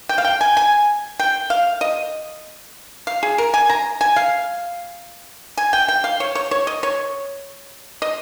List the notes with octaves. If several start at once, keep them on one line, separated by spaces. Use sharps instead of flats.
G5
F5
G5
G#5
G#5
G5
F5
D#5
F5
G#4
A#4
G#5
A#5
G#5
F5
G#5
G5
G5
F5
C#5
C#5
C#5
D#5
C#5
D#5